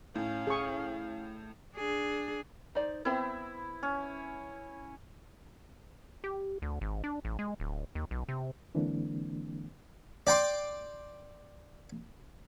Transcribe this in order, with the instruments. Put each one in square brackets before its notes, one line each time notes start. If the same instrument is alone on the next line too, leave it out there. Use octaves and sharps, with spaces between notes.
[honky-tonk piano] A2 [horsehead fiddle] C#4 F5
[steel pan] G#4 C#6
[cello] D4 G#4
[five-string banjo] D#4 C5 D5
[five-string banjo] B3 C4 C5 [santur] E4
[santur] C#4
[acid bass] G4
D2
G#1
D4
A1
G#3
D1
D#2
B1
C3
[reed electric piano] D3 E3 G#3 A#3 C4 D4
[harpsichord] D5 G5 C6 D6